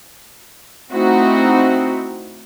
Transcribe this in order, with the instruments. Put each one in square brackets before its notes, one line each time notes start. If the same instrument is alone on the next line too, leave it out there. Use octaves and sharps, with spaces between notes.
[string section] A3 C4 D#4 E4 F#4